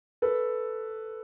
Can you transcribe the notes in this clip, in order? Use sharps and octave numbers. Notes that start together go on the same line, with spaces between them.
A4 B4